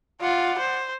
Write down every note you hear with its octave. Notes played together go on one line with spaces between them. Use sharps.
F4 D5 F#5
C5